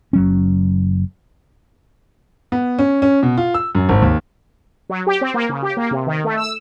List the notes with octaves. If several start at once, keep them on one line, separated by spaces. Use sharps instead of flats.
F#1 F#3 C#4
B3
C#4
C#4
B2
F4
E6
F#2
G#1
D#2
F#3
G4
C4
A#3
C#3
G4
A#3
C3
D#3
A3
E6